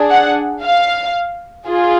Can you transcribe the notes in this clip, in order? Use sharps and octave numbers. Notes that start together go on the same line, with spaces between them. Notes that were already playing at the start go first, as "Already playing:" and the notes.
Already playing: D4 G#4
F#5
F5
F4 G#4